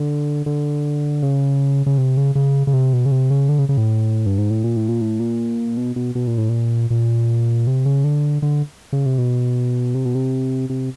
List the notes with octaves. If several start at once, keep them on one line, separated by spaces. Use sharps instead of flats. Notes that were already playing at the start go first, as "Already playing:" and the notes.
Already playing: D3
D3
C#3
C#3
C3
C#3
C#3
C#3
C3
B2
C#3
C3
C#3
D3
C#3
C#3
A2
G2
G#2
A2
A#2
A2
A#2
A2
A#2
B2
B2
B2
A#2
A2
A#2
A#2
C3
C#3
D3
D3
C#3
C3
B2
C3
B2
C3
C3